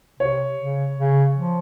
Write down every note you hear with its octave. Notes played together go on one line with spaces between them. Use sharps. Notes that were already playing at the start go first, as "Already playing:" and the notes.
C3 C#5
C#3
C#3
F3